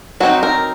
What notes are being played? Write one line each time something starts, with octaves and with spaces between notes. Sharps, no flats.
F#3 C4 D#4 F#4
A#4